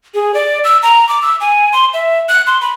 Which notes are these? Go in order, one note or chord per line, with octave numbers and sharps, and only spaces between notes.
G#4
D5
E6
A#5
D6
E6
G#5
C6
E5
F#6
C6
B5